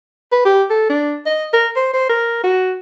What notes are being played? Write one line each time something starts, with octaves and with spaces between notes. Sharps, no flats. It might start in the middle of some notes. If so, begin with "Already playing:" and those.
B4
G4
A4
D4
D#5
A#4
C5
C5
A#4
F#4